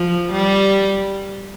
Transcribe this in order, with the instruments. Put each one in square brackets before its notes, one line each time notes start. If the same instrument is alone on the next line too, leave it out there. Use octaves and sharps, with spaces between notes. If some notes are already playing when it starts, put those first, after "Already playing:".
Already playing: [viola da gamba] F3
G3